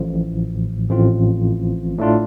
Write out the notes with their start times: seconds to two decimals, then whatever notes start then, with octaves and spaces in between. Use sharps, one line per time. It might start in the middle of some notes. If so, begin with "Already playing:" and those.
Already playing: A1 A2 F3
0.89 A1 A2 F3 C4 F4
1.98 A2 A3 D4 F4